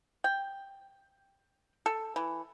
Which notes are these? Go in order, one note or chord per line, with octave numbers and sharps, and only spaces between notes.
G5
A4
E3